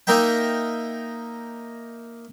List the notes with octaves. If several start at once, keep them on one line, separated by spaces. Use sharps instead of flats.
A#3 D#4 A#4 E5 G5